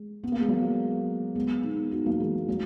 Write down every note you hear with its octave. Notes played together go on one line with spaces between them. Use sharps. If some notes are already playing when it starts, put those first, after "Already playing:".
Already playing: G#3
B3
A#3
G#3
F#3 A#3
G#3 B3
B3 D#4
D#4 F#4
F#3 A#3
E3 G#3
F#3